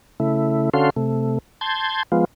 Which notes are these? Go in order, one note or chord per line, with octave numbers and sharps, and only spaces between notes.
C#3 A3 E4
D3 C#4 F#4 A4 F5 C6
C3 A3
A5 C6 G6 G#6
F3 G#3 B3 F4